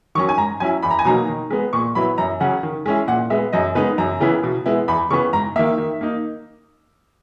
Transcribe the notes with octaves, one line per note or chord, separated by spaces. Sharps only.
D#3 F#3 C#4 C#6
G#5
G#2 A#5
F#3 C#4 E4 G#5
E2 B5
A#5
G#5
B2 F#3 A#3 D#4 A#5
D#3
G#3 B3
A#2 C#6
F#3 B3 E4 B5
F#2 A#5
C#3 F#3 C#4 F#5
D#3
G#3 C#4 E4
A#2 F#5
G#3 B3 E5
F#2 D#5
C#3 G#3 B3 D#4 B4
F#2 A#5
C#3 E3 B3 E4
B2
G#3 B3 E4
E2 B5
C#3 E3 B3 C#6
G#2 A#5
D#3 A#3 E5
D#3
A#3 D#4